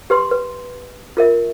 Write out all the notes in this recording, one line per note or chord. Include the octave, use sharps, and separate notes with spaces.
G4 B4 C6
B4
F4 A#4 E5